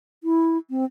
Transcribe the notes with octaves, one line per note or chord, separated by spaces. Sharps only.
E4
C4